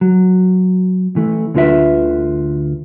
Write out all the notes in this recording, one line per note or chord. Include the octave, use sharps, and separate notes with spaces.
F#3
E3 A3
D2 D3 F4 B4 E5